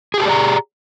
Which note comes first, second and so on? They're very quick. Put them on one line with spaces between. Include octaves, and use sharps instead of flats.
G#4 G4 A5 D5 A#5